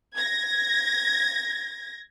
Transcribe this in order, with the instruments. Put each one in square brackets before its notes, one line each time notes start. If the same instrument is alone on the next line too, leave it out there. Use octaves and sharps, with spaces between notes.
[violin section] G#6 A#6